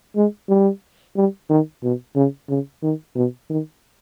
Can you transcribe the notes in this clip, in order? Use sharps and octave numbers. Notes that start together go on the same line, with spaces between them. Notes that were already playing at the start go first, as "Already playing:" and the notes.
G#3
G3
G3
D#3
B2
C#3
C#3
D#3
B2
D#3